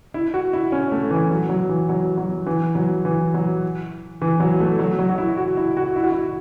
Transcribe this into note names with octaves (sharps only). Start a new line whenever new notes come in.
E4
F#4
E4
C#4
A3
E3
F#3
F#3
E3
F#3
F#3
E3
F#3
E3
F#3
E3
F#3
A3
F#3
F#3
F#4
E4
F#4
E4
F#4
E4
F#4
E4